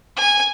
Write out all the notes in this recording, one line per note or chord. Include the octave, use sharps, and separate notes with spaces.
G#5